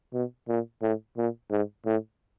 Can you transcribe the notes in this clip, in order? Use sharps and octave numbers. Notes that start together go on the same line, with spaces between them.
B2
A#2
A2
A#2
G#2
A2